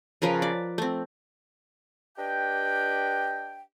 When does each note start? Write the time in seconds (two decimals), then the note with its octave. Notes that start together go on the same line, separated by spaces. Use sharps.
0.22 C#3 F3 A#4 B4
0.42 D5
0.78 A3 C4
2.18 D4 G4 B4 D#5 G5